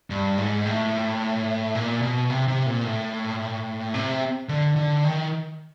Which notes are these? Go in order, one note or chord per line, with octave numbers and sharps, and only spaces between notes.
G2
G#2
A2
A#2
B2
C3
C3
A#2
A2
C3
D3
D3
D#3